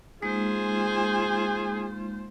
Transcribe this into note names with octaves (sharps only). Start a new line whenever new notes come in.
G#3 A#3 D#4 F4 G#4 C5